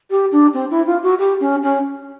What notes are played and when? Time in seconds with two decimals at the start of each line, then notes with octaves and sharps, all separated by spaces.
0.10 G4
0.32 D4
0.54 C4
0.70 E4
0.86 F4
1.03 F#4
1.19 G4
1.40 C#4
1.63 C#4